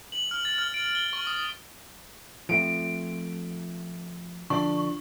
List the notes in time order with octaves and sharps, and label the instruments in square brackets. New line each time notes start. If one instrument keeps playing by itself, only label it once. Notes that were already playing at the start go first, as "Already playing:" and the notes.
[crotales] F#7
F6
A6
F6
D7
G7
C#6
D#6
[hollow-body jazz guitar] F3 A3 C4 [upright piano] D7
[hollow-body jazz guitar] D3 F3 [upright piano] D4 [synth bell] C#6